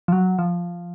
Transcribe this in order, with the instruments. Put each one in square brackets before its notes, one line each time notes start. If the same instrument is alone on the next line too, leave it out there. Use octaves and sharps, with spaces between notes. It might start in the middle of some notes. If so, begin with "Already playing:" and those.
[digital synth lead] F3
F#3
F3